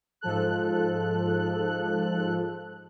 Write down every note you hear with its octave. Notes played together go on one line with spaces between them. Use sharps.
G#2 F3 A4 F#6